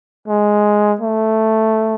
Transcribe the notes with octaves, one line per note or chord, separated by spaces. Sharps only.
G#3
A3